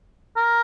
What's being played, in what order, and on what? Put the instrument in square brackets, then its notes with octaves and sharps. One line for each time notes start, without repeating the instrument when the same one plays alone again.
[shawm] A#4